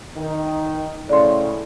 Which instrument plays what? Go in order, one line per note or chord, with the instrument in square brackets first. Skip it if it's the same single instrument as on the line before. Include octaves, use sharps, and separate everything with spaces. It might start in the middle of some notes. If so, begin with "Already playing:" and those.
[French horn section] D#3 D#4
[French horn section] A2 C#3 [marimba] D5 C6